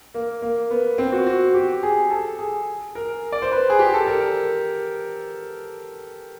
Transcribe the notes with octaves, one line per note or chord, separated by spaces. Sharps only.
A#3
A#3
B3
C4
F#4
F#4
G4
G#4
A4
G#4
A#4
D5
C5
B4
G#4
G4
A4
A#4